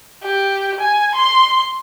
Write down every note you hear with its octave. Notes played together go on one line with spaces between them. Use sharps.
G4
G#5
C6